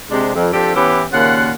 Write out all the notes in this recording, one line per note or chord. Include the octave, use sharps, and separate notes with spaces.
C3 G#3 D4
F2
F3 C4 D4 G4 A4
E3 B3 C#4 E4 G4 B4
D#2 A#2 C#3 F4 F#5